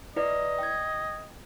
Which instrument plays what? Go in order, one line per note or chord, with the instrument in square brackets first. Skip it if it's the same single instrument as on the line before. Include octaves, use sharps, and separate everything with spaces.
[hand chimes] E4 B4 D5 [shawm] D#5
[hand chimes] G5 G#6